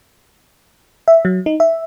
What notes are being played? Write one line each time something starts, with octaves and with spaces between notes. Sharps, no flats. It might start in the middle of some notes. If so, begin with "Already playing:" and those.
E5
F#3
D#4
E5